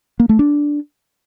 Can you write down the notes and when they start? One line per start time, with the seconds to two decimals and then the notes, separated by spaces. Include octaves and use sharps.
0.20 A#3
0.29 A3
0.39 D4